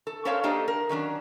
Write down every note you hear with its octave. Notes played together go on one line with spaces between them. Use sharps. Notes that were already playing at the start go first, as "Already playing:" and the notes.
A4
C#4 A4 A#4 C5 C#5 F5
A#3 D4 G4 A4 D#5
A#4
D#3 F#3 C#4 D4